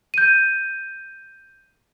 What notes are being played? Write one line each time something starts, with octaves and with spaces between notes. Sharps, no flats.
G6 D#7